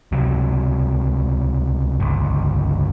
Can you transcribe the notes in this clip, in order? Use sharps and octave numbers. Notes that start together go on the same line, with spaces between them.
C#2 C3 F#3
G1 C#2